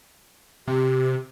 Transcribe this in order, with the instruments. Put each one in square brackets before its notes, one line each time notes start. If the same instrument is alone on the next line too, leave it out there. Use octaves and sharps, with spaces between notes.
[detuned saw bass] C3 [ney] G4